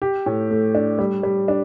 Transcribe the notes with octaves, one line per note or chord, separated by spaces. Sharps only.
G4
A2
A3
D4
G3
G3
D4